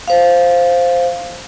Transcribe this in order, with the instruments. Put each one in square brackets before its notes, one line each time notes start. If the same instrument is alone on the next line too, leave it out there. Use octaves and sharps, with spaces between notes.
[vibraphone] C5 F5